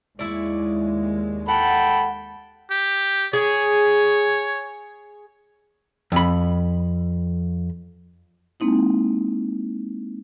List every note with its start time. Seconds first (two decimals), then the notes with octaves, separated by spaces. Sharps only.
0.19 D#2 G#3 E4 C#5 D5
1.48 A4 F#5 G5 B5
2.70 G4
3.33 G#4 C#5
6.12 F2 B5
8.60 G#3 A#3 C4 D#4 E4